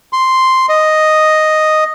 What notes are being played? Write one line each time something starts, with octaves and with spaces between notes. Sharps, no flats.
C6
D#5